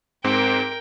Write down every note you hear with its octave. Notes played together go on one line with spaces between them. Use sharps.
G#2 C4 A#4 G5